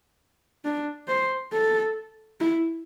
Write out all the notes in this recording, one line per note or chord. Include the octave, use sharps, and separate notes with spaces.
D4
C5
A4
E4